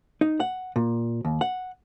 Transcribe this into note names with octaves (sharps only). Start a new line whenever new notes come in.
D#4
F#5
A#2
D#2
F#5